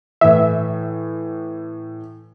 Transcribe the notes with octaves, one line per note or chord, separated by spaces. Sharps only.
A2 E3 E5